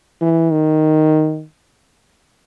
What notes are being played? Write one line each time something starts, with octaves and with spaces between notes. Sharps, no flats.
E3
D#3